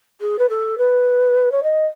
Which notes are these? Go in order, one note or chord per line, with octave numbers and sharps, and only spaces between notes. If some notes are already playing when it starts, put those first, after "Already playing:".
G#4
B4
A4
B4
C#5
D#5